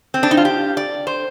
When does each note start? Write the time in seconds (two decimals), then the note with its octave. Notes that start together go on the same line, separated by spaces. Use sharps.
0.14 C4
0.23 D4
0.31 D#4
0.37 F4
0.45 G4
0.77 D5
1.07 C5